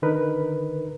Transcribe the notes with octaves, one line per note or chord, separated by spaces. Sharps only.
D3 D#3 D#4 A#4 B4